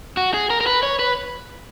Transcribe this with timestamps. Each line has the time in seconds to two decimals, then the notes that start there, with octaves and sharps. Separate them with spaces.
0.17 F#4
0.34 G#4
0.50 A#4
0.61 A#4
0.66 B4
0.83 C#5
0.99 B4